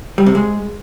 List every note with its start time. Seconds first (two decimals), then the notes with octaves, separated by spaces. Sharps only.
0.18 G3
0.26 C3
0.35 G#3